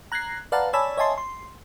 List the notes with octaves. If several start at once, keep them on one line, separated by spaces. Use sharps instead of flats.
A#5 F#6 G#6 A#6 C7
B4 D5 F5 F#5 A5 A#5
C#5 D5 G#5 A5 B5 E6
C#5 D#5 E5 G#5 A5 C6
C6